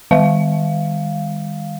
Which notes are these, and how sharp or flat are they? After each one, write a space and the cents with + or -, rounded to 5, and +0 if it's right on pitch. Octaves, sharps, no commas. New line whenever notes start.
D#3 +0 G3 +45 F5 +0